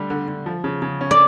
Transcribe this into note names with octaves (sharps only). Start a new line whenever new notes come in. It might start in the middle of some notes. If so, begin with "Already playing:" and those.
Already playing: D3 G3 A3
D3
D3
F3
C#3
C#3
C#4
D5